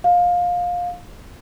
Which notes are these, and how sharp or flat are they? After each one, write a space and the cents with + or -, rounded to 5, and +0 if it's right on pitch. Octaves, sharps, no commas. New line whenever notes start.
F5 +20